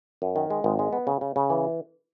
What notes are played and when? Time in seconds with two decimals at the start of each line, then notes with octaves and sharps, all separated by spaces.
0.22 F#2
0.36 D#3
0.50 G#3
0.64 G#1
0.79 G#3
0.93 B3
1.07 C#3
1.21 C#3
1.36 C#3
1.50 E3